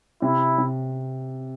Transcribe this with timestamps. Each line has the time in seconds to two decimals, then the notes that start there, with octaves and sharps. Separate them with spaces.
0.22 C3 E4
0.58 C3